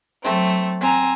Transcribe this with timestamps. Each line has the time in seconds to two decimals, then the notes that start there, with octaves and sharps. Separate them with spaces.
0.23 F#3 A3 C4
0.80 C4 G#5 A#5